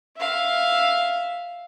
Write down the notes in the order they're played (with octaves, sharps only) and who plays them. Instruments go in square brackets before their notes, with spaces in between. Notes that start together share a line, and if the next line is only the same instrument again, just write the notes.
[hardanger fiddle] E5 F5